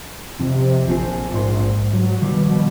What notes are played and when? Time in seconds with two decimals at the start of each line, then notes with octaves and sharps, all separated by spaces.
0.40 F2 C3
0.88 A#1 F3 C4 G#4
1.32 G#2 C6
1.93 F#3
2.22 B2 D#3 F3 G3